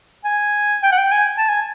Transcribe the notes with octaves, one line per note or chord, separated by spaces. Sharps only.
G#5
G5
F#5
G5
G#5
A5
G#5